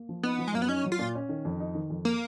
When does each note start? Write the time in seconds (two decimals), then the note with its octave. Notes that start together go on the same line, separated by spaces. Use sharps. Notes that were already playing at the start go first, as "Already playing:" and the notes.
Already playing: A#3
0.09 F3
0.23 B3 D#4
0.38 F3
0.48 G#3
0.53 F#2 A#3
0.62 B3
0.69 C#4 D#4
0.85 F#3
0.92 F4
0.99 A#2
1.15 C#4
1.29 D#3
1.45 F2
1.60 D#4
1.75 D#3
1.90 F2
2.05 A#3 A#4